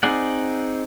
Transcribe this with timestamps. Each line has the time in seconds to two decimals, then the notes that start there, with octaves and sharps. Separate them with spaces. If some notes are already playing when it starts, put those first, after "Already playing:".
0.03 C4 D#4 G#4 D5 F#5